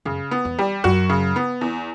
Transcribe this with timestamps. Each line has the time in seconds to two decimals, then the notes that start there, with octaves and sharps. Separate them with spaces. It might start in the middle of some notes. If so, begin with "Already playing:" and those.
0.05 F#2 C#3
0.31 B3
0.45 E2
0.59 G3
0.84 F#2 F#4
1.10 C#3
1.36 B3
1.61 E2